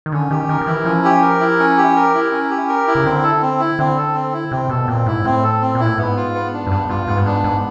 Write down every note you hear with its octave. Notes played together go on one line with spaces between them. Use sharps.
D#3
D3 C#4
D#3 G4
D#3 A#4
D#3
E3 E4
F3 C#4
G4
A#4
E4
C#4
G4
A#4
E4
C#4
G4
A#4
E4
C#3
D3 C4
A4
C4
E4
D3 C4
A4
C4
E4
C3 C4
B2 A4
A#2 C4
G#2 E4
A2 C4
A4
C4
A#2 E4
A2
G#2 B3
F4
B3
D4
F#2
G2 B3
G2 F4
G#2 B3
G2
G#2 D4
G#2 B3